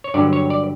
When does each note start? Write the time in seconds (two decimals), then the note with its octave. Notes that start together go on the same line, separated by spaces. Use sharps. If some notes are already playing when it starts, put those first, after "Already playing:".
0.04 C#5
0.14 G2 D3 F#3 D5
0.33 C#5
0.50 D5